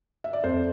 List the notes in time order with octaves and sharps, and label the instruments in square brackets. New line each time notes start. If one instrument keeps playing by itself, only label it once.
[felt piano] E5
D5
[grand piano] F2 [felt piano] A4 C5